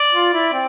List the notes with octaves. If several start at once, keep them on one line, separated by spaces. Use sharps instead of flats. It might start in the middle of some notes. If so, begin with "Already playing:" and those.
Already playing: D5
F4
E4
C4